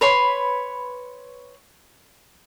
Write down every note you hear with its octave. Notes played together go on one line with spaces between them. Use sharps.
B4 C#5 B5 C6